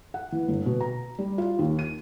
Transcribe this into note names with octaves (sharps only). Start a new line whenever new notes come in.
F#5
E3
G1
B2
A#5
G3
F4
D#2
D#7